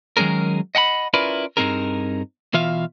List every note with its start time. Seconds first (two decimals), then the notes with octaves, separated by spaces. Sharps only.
0.17 D#3 F#3 G#3 C#4 G#4 A#4
0.75 D#5 F#5 G5 B5
1.14 C#4 E4 F4 A#4 B4 D5
1.57 G2 B2 C4 D#4 G#4 A#4
2.54 B2 E3 F4 E5 F5